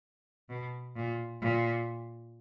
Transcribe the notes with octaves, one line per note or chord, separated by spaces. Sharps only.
B2
A#2
A#2